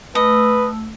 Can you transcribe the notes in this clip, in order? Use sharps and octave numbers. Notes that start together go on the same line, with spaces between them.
A3 B4 D#5 E6